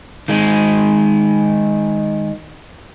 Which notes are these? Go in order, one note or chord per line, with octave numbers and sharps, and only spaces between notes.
D#3 G#3